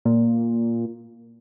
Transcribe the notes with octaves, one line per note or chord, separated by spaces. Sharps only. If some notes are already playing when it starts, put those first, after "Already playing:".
A#2